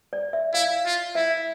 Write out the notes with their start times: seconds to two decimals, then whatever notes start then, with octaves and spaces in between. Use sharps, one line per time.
0.13 D5
0.33 E5
0.54 E4 F5
0.86 F4
1.15 E4 E5